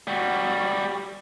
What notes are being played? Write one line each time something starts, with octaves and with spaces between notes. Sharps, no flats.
G3 F#4